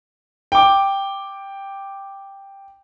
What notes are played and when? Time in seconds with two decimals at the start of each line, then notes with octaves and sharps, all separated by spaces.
0.52 G5 D6